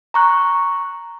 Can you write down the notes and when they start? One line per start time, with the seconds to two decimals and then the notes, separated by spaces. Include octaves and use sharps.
0.14 A#5 C#6 F#6